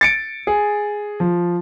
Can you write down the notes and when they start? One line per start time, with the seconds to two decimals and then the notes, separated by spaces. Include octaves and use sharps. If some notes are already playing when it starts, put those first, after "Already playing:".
0.01 A6 C#7 D7
0.47 G#4
1.20 F3